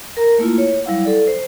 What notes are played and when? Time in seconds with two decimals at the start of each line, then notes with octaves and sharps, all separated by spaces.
0.17 A#4 A#5
0.38 A3 A#3 E4 F4
0.58 C#5
0.86 F#3 G3 E4 F5 F#5
1.05 A4 D5
1.27 C5